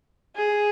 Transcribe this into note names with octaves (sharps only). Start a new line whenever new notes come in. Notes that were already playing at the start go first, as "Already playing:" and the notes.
G#4